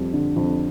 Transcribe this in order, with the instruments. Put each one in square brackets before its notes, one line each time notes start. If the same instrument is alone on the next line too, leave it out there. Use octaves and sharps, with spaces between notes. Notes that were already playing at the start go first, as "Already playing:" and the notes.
Already playing: [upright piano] F2 G3
D3
F2